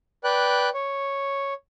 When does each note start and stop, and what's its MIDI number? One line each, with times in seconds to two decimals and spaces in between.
0.24 0.69 71
0.24 0.69 74
0.24 0.69 79
0.24 0.69 90
0.74 1.54 73